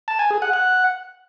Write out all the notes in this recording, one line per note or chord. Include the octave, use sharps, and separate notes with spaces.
A5
G#5
G#4
F#5
F#5